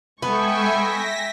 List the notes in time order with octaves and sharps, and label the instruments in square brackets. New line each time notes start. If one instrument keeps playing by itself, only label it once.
[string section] G#3 A4 C#6 [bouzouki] B3 [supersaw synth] E5 G5 G#5
[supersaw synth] A#6 B6